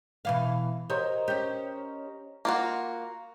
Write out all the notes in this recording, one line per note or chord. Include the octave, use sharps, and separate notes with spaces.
B2 E3 F5
G4 A#4 C5 C#5 D#5
C#4 G4
A#3 F4 F#4